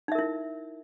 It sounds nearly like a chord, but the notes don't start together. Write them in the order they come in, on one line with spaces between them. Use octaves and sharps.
D#4 E5 A#4 E4